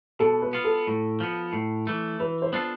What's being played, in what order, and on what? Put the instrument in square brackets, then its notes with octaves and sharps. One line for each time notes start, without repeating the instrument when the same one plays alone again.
[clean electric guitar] B2 [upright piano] A4
[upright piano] B4
[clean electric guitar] B3 F4
[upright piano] A4
[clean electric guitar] A2
F3 B3
A2
E3 A3
[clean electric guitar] E3 [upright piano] B4
[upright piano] C5
[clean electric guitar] B3 D4 F4 A4